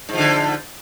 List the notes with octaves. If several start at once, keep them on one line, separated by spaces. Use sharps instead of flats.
G#2 D3 F3